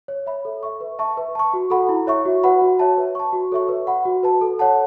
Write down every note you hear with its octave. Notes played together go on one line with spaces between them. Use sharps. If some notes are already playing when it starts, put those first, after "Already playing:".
C#5
E5 B5
A4
E5 C#6
B4
E5 A5 C#6
B4
A5 C#6
F#4
A4 F#5 B5
E4
C#5 E5 C#6
F#4
B4 F#5 B5
F#4
C#5 E5 A5
B4
A5 C#6
F#4
A4 C#5 E5 C#6
B4
F#5 B5
F#4
B4 A5
A4
C#5 F#5 A5